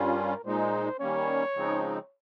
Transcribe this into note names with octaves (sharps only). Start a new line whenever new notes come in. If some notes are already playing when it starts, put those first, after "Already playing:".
Already playing: G2 G3 C#4 F4 A#4
A#2 G#3 D#4 C5
D#3 G3 A#3 C#4 C#5
C#3 F3 G#3 C4 D#4